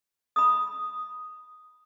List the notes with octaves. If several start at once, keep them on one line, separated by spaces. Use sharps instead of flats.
B5 D#6